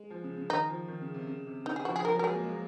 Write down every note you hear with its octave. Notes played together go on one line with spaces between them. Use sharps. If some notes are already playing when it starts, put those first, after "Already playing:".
Already playing: G#3
F3
C#3
C#3
D#3 D#4
F3
D#3
C#3
C3
C#3
C3
C#3 D#4
G#4
F3 F#4
G#4
F3 A#4
F#3 A#4
G#3 G#4
A#3
G#3
A#3